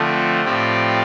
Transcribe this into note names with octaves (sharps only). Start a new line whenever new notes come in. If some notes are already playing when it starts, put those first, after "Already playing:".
Already playing: D3 F3 A3 C4
A2 F3 C4 G4 D5